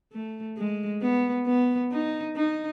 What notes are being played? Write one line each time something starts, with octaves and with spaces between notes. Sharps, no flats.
A3
G#3
B3
B3
D#4
D#4